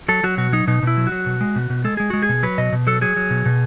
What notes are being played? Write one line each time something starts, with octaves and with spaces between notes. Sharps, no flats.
F#3 A4
F#3 F#4
B2 F#4
F#3 D#4
B2 D#4
B2 E4
F#3
F#4
F#3
B2
G#3
B2
B2
G#3 A4
G#3 G#4
G#3 F#4
G#4
B2
F#3 B4
B2 D#5
B2
F#3 A4
F#3 G#4
F#3
B2
B2